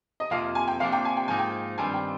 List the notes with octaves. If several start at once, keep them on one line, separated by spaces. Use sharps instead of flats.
D#5
F2 C3 F3 A#3 F5
G#5
G5
C3 F3 A#3 D4 F5
G5
G#5
G5
G#2 F3 A#3 D#4 G#5
G5
G2 D#3 G3 C4 F4 G#5
G5